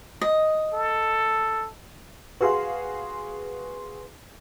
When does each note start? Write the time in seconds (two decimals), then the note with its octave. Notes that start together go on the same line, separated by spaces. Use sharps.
0.21 D#5
0.74 A4
2.41 F#4 G#4 B4 F5 C6